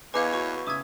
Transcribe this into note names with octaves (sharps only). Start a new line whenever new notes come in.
E2 B4 C#5 D#5 F5 G#5 D6
F#4 C#6
C#3 E5 D6 D#6 G#6